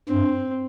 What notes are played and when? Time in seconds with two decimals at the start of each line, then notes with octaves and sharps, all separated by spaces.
0.08 G2 C4